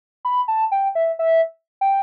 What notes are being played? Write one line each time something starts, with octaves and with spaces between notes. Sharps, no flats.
B5
A5
G5
E5
E5
G5